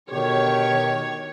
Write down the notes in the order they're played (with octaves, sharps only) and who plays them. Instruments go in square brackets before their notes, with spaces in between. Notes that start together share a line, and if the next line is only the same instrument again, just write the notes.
[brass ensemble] B2 D3 G4 [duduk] D#3 [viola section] C#5